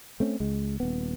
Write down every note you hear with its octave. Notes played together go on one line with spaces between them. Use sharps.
A3 C4 C#4
C#2 G#3
D#1 B3